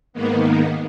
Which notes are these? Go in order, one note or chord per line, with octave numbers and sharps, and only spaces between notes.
G#2 D#3 A#3 B3